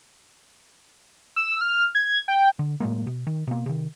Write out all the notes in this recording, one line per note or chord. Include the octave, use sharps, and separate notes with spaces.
E6
F6
G#6
G5
D3
A2 F#3 G#3 A#3
B2
D#3
B2 A#3
C3 D#3